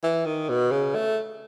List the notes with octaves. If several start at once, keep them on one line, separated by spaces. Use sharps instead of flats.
E3
D#3
B2
C#3
A3